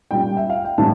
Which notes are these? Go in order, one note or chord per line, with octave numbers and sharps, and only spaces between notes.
A#2 G3 C#4 G5
E5
F5
G5
A2 E3 G3 C#4 A5